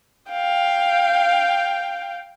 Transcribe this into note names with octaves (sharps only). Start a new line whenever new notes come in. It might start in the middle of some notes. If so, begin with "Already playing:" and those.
F5 G5